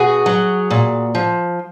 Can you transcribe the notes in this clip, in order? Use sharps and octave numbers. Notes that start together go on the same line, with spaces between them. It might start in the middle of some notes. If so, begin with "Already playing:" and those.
Already playing: B2 F#4 G#4
F#3
A#2
F3